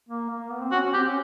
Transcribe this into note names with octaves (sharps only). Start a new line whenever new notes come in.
A#3
A#3
B3
C4
C#4 F#4
C#4
C4 G4
C#4